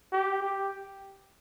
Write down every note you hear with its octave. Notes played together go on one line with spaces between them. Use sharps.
G4
G4